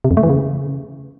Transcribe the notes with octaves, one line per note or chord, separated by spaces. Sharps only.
C3
F2
A3
E3
C#3